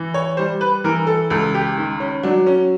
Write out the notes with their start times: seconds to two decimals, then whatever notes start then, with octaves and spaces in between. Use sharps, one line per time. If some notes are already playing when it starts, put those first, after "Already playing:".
Already playing: E3
0.14 C#5
0.37 G3 C5
0.61 B4
0.84 E3 A#4
1.07 A4
1.30 C#2 A4
1.54 G4
1.77 D#3
2.00 C#4
2.23 F#3 D4
2.47 C#4